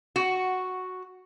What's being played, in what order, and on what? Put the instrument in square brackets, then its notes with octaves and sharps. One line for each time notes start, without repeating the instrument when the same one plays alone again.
[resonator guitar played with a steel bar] F#4